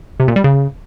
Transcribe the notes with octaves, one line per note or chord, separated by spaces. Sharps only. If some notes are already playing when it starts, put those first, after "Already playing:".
C3
A#2
G3
C#3